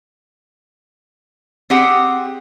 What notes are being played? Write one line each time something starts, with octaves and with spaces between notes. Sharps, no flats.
C4 G4 G#4 F#5